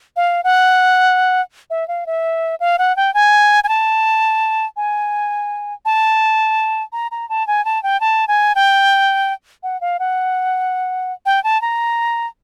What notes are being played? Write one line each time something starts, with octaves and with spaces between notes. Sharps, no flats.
F5
F#5
E5
F5
E5
F5
F#5
G5
G#5
G#5
A5
G#5
A5
A#5
A#5
A5
G#5
A5
G5
A5
G#5
G5
F#5
F5
F#5
G5
A5
A#5